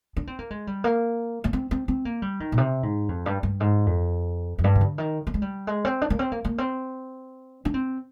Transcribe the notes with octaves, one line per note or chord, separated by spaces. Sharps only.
D4
C4
A#3
G#3
G3
A#3
A#3
C4
C4
C4
A#3
G3
D#3
A#2
C3
G#2
F2
G2
G2
G#2
F2
F2
G2
C3
D3
D#3
A#3
G#3
G3
G#3
C4
D4
A#3
C4
A#3
A#3
C4
D4
C4